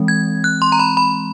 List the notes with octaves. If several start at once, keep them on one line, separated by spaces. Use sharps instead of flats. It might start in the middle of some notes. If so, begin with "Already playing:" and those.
Already playing: E3 G#3 C4
G#6
F#6
C6
A#5
B5
B5